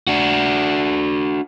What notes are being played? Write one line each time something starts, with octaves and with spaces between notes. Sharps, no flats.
D4 F#4